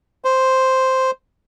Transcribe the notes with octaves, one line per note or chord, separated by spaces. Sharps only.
C5